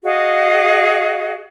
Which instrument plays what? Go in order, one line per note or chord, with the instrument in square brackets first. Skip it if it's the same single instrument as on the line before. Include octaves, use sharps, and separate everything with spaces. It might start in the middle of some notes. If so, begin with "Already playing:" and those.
[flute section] F#4 G#4 D#5 F5